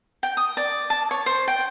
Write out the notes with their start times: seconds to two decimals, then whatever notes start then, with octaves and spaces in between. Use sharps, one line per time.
0.23 G5
0.37 D#6
0.57 D5
0.90 A5
1.11 C#5
1.26 C5
1.48 G5